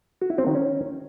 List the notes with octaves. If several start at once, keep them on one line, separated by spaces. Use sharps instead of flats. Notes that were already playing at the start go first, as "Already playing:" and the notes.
F#4
E4
C4
D#3
C#4